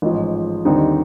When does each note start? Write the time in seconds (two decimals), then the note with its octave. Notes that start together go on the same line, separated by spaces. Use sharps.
0.02 A1 G#2 F3
0.65 D#2 D3 G3 C4 D#4